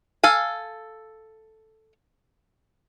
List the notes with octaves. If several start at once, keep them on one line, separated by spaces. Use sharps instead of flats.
A4 F5 G#5